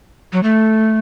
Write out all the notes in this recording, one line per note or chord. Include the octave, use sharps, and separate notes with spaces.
F#3
A3